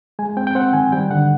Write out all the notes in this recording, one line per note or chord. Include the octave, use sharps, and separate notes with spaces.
G#3 G#5
C4 G5
G5
C4 F#5
D#3 G#5
G3 G5
D3 F#5